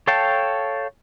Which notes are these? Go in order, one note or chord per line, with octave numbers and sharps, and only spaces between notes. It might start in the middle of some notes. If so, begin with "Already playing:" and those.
A4 C#5 F5 G5 A5